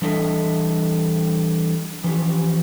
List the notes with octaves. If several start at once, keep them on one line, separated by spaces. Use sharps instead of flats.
E3 G3 D4 A4 D#5 E5
E3 F3 C#4 G4